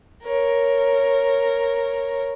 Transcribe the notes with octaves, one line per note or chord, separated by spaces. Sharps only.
A#4 C#5